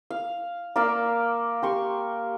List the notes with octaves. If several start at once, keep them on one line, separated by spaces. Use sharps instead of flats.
F5
A#3 D5 E5 F5
G4 C6 C#6